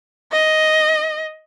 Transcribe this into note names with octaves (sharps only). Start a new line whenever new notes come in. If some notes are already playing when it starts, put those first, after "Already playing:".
D#5